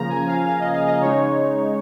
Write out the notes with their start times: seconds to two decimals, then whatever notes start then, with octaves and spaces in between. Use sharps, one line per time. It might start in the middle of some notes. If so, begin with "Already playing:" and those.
Already playing: C#3 F3 A#3 A#5
0.09 G#5
0.27 F5
0.45 F5
0.59 D#5
0.73 F5
0.87 D#5
1.00 C#3 G#3 D#4 C#5